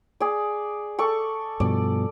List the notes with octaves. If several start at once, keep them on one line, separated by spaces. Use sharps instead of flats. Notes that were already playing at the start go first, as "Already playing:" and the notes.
G#4 D5
A4 D5 C#6
G2 B2 F3 D5